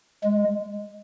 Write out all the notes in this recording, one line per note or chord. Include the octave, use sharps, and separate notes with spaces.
G#3